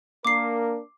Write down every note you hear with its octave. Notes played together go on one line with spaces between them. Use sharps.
A#3 D4 A#4 D6 C7